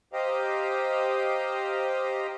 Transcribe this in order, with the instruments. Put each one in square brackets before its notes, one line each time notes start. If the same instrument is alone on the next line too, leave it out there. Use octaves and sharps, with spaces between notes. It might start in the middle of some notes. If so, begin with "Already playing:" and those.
[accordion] G4 C5 D#5 F5 G5 A#5